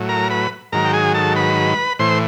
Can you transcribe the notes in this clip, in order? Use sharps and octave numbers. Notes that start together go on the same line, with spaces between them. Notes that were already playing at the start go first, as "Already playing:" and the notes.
Already playing: A2 F#3
A#4 A#5
B4 B5
G#2 D#3 F#3 A#4 A#5
G5
G#4 G#5
A4 A5
B4 B5
A2 E3 C5 C6